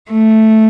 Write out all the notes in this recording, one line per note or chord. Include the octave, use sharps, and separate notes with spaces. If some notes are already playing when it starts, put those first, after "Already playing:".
A3